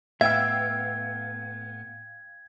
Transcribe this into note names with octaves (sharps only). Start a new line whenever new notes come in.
A2 B3 E5 F5 G5 E6 G#6